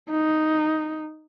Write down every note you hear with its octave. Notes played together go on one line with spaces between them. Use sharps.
D#4